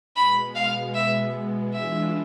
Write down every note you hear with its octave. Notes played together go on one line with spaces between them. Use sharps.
B2 G#3 B3 B5
F5
E5
E3 G#3 D4 F4 E5